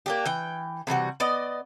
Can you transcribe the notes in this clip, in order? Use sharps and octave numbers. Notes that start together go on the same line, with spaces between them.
A#3 D4 G4
E3 G5
C3 E3 G3 F#4
B3 D5 D#5